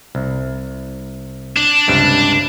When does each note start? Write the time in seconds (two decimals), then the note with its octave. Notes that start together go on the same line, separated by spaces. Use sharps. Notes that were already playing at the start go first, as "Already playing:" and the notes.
0.15 C2
1.57 D4
1.88 C#2 G2 C3